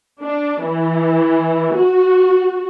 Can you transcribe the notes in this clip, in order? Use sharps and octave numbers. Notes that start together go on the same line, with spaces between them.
D4
E3
F#4